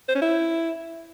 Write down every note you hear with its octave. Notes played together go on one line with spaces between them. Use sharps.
C5
C#4
E4